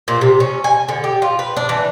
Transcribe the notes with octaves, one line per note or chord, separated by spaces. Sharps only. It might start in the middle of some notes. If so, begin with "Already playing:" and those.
A#2
C3
C#4
G#5
D3
G4
F4
B4
D4
E3